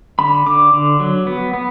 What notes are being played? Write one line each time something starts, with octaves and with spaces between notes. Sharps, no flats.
D3 B5
D3 D6
D3
F#3
B3
B3